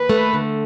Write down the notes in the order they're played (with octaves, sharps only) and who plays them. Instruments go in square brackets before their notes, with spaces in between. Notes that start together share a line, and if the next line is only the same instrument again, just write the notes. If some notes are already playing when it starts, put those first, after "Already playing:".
Already playing: [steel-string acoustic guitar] D#2 [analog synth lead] B4
[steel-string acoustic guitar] A3
D3